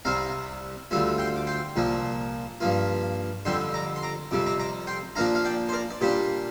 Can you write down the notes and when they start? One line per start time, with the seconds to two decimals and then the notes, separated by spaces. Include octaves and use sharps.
0.05 C2 C3 G3 C4 F5 A#5
0.91 D2 D3 G3 C4 F4
1.18 G5 C6
1.36 D6
1.47 G5 C6
1.76 C2 A#2 F3 A#3
2.60 G2 F3 A#3 F4
3.45 F2 D3 G3 C4 G5 C6
3.74 A#5 D6
3.96 C6
4.03 A#5 D6
4.31 F2 C3 G3 C4 D6
4.46 A#5 D6
4.60 A#5 D6
4.87 G5 C6
5.16 A#2 F3 A#3 D4 F5 A#5
5.35 F5
5.45 D5 G5
5.69 C5
5.72 A#4 D5
5.91 D5
6.01 A#2 G3 D4 G4 C5